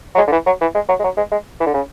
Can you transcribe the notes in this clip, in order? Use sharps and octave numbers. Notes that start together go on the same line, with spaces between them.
F#3
G#3
D3
E3
F#3
E3
G#3
F#3
G#3
F#3
G#3
G#3
E3
D3
C#3